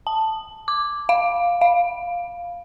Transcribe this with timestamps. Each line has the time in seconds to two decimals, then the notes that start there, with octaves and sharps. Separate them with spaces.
0.07 A5
0.68 D6
1.09 F5
1.61 F5